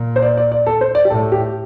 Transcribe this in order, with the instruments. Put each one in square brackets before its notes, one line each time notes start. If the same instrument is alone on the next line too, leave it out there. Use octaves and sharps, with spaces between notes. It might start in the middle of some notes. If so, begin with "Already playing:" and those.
Already playing: [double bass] A#2
[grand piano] C5
D5
D5
D5
A4
C5
D5
G4
[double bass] A2 [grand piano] A4
[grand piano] G4